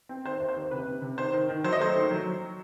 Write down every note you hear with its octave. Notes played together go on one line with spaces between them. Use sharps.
C4
D#3 C5
D#2
C5
D#3
C3 B4
C3
C3
D#3 C5
D#3
D#3
F#3 C5
D#5
A3 C5
D#3
F#3
F#3